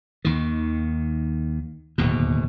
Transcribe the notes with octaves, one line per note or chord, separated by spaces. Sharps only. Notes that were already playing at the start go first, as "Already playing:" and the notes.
D#2 D#3
D1 D#2 B2